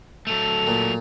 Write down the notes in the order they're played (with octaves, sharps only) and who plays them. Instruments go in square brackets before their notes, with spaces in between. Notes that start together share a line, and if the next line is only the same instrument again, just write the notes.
[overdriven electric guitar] F#3 A3 [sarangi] A4 [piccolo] F7
[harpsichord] A#2